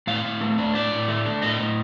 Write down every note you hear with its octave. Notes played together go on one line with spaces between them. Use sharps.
A2 F5
A2
A3
D4
A2 D5
A2
A3
D4
A2 D#5
A2